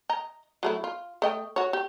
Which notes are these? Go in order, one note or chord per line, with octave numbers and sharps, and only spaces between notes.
D#5 A#5
F#3 A3 E4
F4
A3 D#5 G5
F#4 C#5
G4